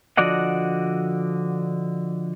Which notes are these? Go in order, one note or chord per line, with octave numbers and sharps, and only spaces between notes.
D3 F3 F#4 D5 D#5 F#5